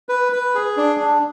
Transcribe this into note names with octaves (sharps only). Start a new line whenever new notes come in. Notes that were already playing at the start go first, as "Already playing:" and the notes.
B4
B4
G#4
D4
D4